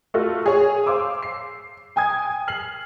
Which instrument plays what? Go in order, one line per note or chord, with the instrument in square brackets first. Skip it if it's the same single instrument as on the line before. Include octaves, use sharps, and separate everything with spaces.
[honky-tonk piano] A3 F4 F#4 A4
G#4 C#5
C5 F5 C6 D6 E6
C7
G5 G#5 D#6 G#6
F6 C7 F#7